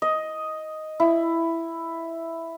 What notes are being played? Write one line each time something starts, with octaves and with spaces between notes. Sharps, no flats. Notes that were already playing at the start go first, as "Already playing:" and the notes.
D#5
E4